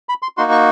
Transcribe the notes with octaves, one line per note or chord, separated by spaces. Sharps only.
B5
C6
A#3 D#4 F#4 C6
C#6